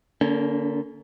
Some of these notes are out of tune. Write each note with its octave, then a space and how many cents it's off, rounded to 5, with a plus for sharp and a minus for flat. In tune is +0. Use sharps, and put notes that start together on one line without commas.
D3 -15 A#3 +0 C#4 +30